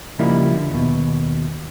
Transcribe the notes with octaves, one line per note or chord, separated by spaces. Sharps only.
C#3 F3 G3 A#3 D#4 E4
D3
D#2 B2